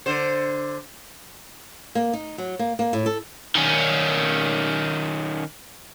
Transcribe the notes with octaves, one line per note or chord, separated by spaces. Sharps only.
D3 C5
A#3
D#4
F#3
A#3
A#3
A2
A4
D#3 C#4